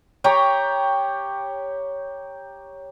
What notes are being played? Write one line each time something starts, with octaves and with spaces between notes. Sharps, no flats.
G4 C#5 G5 A#5